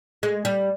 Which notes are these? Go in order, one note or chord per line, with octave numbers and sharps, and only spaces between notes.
G#3
G3